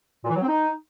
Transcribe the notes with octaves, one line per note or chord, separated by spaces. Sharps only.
A#2
E3
F#3
C4
D#4